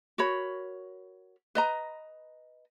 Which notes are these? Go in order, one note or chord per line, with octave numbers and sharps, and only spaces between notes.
F#4 A#4 C#5 B5
B4 D#5 A#5